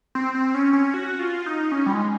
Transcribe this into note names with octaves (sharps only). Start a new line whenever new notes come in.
C4
C4
C#4
C#4
F#4
F4
D#4
C#4
G3
G#3